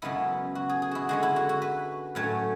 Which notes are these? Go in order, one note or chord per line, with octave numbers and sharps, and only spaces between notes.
F#2 C#3 G#3 B3 E4
F#4
G#4
G#4
E4 F#4
D3 G#3 C#4 F#4
E4
F#4
F#4
B4
A2 F#3 A3 C#4 C#5